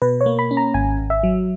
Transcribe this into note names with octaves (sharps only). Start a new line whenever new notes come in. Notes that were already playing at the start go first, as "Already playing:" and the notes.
B2 B4
C#5
A#3
B5
C#4
A#5
G#1 G#5
G#1
E5
F#3